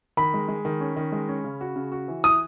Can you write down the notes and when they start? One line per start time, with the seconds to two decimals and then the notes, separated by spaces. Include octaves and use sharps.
0.17 D#3 B5
0.34 G#3
0.48 G#3
0.65 D#3
0.80 C#4
0.96 D#3
1.12 G#3
1.29 C#4
1.44 C#3
1.61 F#4
1.76 C#3
1.92 F#4
2.08 E3
2.24 E4 D#6